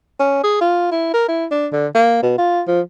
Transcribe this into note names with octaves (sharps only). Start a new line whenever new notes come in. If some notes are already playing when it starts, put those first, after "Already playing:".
C#4
G#4
F4
E4
A#4
E4
D4
D3
A#3
B2
F4
F3